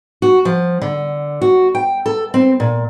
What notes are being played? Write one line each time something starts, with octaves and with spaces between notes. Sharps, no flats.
F#4
F3
D3
F#4
G5
A4
C4
A#2